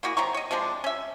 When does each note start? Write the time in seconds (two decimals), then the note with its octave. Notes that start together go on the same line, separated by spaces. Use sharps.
0.03 A#3 E4 F#4 G#4
0.17 C3 F#3 A#5 C#6
0.34 C#5 D#5
0.51 C3 F3 G#3 D4
0.84 C#4 E5